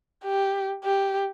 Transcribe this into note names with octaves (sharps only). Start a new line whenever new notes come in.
G4
G4